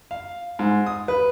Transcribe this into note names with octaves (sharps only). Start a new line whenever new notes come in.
F5
G#2
D#6
B4